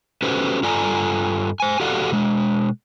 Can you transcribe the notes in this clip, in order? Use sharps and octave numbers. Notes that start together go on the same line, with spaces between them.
C#4 F#4 G4 A4 B4 C5
G2 F4 A4 D5 G#5 A#5
C5 G#5
F#4 G4 A4 D5 F5 F#5
B2 G#3